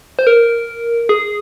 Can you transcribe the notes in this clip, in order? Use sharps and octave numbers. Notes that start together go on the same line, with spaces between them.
C5
A#4
G#4